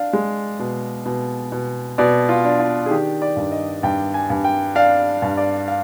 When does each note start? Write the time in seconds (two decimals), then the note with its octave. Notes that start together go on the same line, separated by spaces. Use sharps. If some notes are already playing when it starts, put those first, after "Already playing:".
Already playing: D4 F5
0.13 G#3
0.59 B2
1.06 B2
1.52 B2
1.98 B2 D5
2.29 F4
2.45 D4
2.60 F4
2.86 G#4
2.90 D#3 G4
3.22 D5
3.36 G2
3.52 D#5
3.83 G2 G5
4.14 G#5
4.30 G2
4.44 G5
4.75 D4 F5
5.22 G2
5.37 D5
5.68 F5